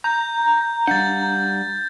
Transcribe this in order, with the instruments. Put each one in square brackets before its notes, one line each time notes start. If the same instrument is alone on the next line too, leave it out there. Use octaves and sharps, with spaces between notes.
[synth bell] A#5 [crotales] G6
[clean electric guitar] G3 F5 F#5 [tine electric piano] D4 [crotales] G6 A6